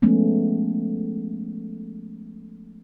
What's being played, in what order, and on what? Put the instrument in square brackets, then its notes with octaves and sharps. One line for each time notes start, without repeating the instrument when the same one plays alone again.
[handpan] F3 G#3 A3 B3 C#4